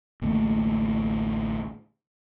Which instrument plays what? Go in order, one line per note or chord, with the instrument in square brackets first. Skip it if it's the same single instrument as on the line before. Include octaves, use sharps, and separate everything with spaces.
[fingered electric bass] A1 D2 A3 A#3